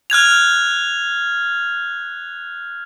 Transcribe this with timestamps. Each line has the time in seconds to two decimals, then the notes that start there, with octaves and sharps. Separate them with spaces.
0.10 F6 F#6 G#6 F7